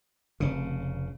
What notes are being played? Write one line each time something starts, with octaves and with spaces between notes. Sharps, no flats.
F1 C#3